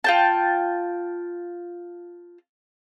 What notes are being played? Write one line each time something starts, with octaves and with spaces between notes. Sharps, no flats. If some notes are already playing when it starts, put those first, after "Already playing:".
F4 G5 A5